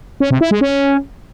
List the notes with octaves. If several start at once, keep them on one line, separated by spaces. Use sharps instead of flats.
C#4
C3
E4
G#3
C#4